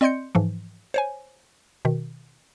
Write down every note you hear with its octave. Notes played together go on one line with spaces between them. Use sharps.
C4 D5 D#5 C6 G6 C#7
G#2 E3 F3
C5 C#5 G#5
B2 D#3